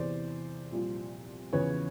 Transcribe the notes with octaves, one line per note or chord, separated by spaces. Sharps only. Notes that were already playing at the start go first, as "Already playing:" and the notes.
Already playing: E2 C3 E3 C5 D5
C2 A#2 F3
E2 C#3 F3 B4 C#5